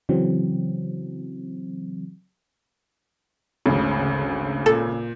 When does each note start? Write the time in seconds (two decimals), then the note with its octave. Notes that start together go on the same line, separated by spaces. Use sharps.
0.09 C#3 E3 F#3 C4
3.66 G#1 D2 C#3
4.66 A#2 A4